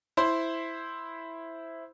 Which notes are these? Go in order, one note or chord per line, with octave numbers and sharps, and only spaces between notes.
E4 C5 C6